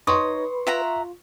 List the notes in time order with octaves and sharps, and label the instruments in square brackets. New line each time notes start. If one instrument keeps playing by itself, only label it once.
[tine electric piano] D#4 C#5 D#5 [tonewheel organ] B4 [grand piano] C6 C#6 [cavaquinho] D#6
[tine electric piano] F4 [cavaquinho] E5 F#5 A#5